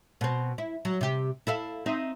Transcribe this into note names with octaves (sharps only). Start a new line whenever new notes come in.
B2 C4
E4
F#3
C3 G4
E4 A4 F5
C4 D#4 E5